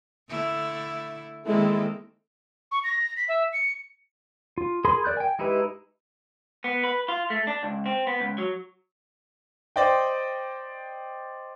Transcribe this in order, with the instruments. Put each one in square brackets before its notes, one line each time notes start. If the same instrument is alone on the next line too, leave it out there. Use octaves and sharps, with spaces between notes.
[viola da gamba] D3 A3 E4
[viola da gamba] D#3 A#3 C4 [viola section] G#3 E4 A4
[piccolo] C#6
A#6
B6
E5
C#7
[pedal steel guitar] F4
G#4 A#4 B5 C6
A#4 D5 F#6 G6
G5 G#5
G#3 D#4 E4 G4 B4
[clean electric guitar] B3
B4
F4
A3
D4
C#2
C4
B3
C#2
F#3
[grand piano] C5 D5 D#5 G5